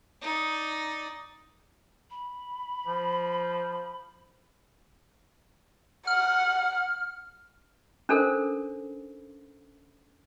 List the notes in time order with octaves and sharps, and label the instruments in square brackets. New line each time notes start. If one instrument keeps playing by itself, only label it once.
[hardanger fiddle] D#4 D5
[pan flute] B5
[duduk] F3
[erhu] F#5 [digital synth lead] F6
[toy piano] C#4 D4 A4 A#4 C5